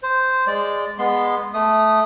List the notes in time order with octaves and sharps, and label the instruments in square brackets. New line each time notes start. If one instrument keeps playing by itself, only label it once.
[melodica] C5
G#3 D5
G#3 B3 C6
A3 D#6